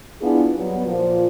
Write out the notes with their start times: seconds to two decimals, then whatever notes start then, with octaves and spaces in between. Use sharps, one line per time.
0.21 B3 D4 E4 F4 G#4
0.56 F#3 G3 B3
0.86 A#2 F3